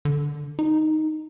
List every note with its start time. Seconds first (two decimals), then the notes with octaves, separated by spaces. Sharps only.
0.05 D3
0.59 D#4